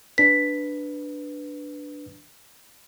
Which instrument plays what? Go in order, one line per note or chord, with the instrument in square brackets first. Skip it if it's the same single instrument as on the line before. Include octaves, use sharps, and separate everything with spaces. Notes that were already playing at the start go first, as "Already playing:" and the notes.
[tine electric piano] D4 B4 [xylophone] B6